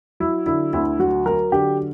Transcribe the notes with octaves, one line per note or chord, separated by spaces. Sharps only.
F#3 E4
D3 E4
D2 E4
F#3 F#4
F#3 A#4
D3 G4